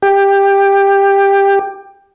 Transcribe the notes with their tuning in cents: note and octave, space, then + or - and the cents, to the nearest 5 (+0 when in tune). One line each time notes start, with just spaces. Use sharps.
G4 +15